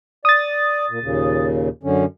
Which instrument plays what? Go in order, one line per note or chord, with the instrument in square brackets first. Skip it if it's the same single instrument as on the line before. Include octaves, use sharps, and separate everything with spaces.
[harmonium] D5 [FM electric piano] D#6 A6
[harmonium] A#2
D#2 A#2 C#3
F#2 D3 C#4